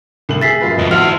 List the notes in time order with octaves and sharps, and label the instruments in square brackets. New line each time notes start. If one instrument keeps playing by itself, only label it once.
[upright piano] C2 A3 F#7
[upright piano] G#4 E5 [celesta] A6 B6 C7
[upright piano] F#2 F4 B4
[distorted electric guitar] F2 [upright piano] D#5
[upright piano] E4 F#5 F7 [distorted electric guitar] F#4 C5 [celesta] F6